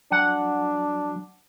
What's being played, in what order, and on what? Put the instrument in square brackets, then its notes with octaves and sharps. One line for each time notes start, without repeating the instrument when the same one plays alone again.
[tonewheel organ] F#3 [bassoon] D4 [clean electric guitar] F#5